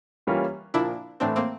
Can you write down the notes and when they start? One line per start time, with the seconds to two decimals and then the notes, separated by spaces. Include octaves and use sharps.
0.27 E3 G3 A#3 C#4 F4
0.74 A#2 F3 A#3 D4 E4
1.20 A2 E3 A3 C4 D4
1.36 A#3 C4